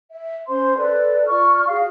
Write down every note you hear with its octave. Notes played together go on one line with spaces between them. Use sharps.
E5
C#4 C5 C6
A4 B4 D5
F4 D5 C#6 F6
F#4 G#4 F5